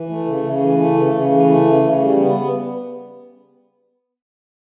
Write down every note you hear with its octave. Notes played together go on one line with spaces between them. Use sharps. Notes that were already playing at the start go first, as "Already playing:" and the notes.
Already playing: E3
A3
C#3
C#3
E3
A3
C#3
C#3
E3
A3
C#3
C#3
G3
B3